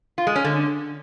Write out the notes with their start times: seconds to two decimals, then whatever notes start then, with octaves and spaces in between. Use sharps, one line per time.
0.18 F4
0.27 G#3
0.36 C#4
0.44 D3